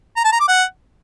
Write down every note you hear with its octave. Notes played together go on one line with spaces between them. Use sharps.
A#5
A5
A#5
D6
F#5